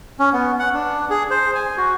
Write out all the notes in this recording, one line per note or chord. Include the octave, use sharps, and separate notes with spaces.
C#4
B3
F#5
D4
G#4
C5
G#5
F#4